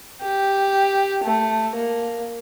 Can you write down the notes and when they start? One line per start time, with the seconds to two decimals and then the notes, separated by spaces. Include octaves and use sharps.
0.22 G4
1.24 A3
1.75 A#3